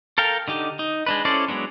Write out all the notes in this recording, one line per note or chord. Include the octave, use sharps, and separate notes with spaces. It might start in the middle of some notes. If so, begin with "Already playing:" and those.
A4 A#4 F5 G5
D3 D#4 G4
D#4
G#3 D4 B4
C#4 E4 A4 C5 D5
F#3 G#3 B3 D4